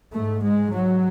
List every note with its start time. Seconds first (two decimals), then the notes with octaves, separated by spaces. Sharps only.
0.14 G#2 A3
0.43 G#3
0.72 F#3